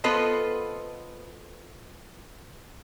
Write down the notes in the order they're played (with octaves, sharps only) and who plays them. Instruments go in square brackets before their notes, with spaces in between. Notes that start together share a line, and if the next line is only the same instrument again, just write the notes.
[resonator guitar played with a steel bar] B3 F4 A4 B4 C5 D#5